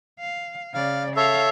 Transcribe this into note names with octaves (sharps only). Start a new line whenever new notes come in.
F5
C#3 D5 F5
A4 C#5 E5 F5